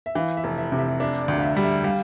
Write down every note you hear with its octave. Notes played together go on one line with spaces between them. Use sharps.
E5
E3 F5
E5
F1
E5
C3
E5
D4 E5
D5
D2
F5
E5
G3
E5
G3 F5